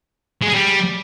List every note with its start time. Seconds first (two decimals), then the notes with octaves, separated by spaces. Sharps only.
0.42 G#3
0.47 G#4
0.53 G3